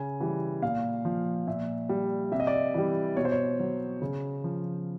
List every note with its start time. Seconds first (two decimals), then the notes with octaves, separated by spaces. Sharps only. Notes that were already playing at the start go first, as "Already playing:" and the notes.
Already playing: C#3 G#5
0.20 E3 G3
0.62 A#2 F5
1.05 F3
1.47 A#2 E5
1.89 G3
2.32 C3 E5
2.40 D#5
2.47 D5
2.55 D#5
2.74 E3 G3
3.17 B2 C#5
3.25 C5
3.32 C#5
3.60 F#3
4.02 C#3
4.44 F3